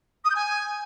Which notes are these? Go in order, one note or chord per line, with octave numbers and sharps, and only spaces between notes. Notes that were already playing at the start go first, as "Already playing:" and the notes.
D#6
G6
G#5